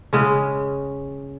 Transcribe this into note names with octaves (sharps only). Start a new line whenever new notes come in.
C#3 G#3 C#4